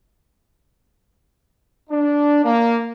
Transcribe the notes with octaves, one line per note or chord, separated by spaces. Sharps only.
D4
A#3